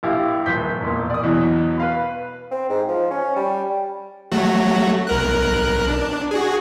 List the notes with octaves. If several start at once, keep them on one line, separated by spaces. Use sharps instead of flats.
A#1 E4 G4 F5
D#1 F3 B4 G6 B6
E1 A#2
D5 D#6
E2 B2 E3 F#3
B4 F5 B5
C4
G#2
F3
C#4
G3
F#3 A3 F#4
B1 A#4 F#6
D4
F#4 G#4